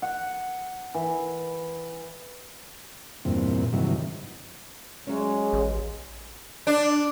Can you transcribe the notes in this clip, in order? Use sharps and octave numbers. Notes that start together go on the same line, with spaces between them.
F#5
E3
E2 G2 A#2 C4
G2 C3 D#3 E3 F#3
F#3 G#3 C#4
A1
D4